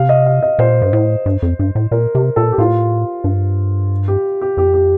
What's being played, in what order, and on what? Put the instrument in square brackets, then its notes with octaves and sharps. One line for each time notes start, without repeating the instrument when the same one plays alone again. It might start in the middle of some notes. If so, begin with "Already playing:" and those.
Already playing: [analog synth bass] C3 [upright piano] F5
[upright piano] D#5
F5
D#5
[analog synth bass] A#2 [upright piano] C5
[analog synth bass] G2
A2
G2
F2
G2
A2
[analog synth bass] A#2 [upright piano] A#4
[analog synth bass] C3
[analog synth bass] A#2 [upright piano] A4
[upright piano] G4
[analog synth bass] A2 [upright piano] F4
[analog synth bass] G2
[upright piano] G4
G4
[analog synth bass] F2 [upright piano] G4
[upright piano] G4